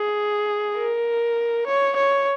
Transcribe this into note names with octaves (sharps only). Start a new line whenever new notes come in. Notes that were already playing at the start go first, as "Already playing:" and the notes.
Already playing: G#4
A#4
C#5
C#5